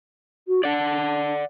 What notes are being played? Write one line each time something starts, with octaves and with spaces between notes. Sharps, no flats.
F#4
D4 D5 F#5